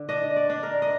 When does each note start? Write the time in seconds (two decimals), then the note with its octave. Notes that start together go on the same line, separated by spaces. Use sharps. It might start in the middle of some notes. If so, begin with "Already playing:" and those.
Already playing: D3
0.09 D4 D#5
0.36 D5
0.49 D4
0.63 A#4
0.82 D#5